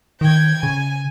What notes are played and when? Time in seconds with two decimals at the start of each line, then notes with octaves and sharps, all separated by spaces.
0.21 D#3 G5 G#6
0.63 C#3 G#5